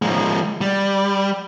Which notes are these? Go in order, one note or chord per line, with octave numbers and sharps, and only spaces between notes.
F3 G#3
G3